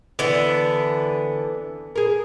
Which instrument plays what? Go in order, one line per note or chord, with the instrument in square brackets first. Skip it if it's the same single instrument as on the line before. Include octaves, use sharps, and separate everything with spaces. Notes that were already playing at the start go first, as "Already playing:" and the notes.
[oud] D3 [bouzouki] E3 B3
[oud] G#4 A#4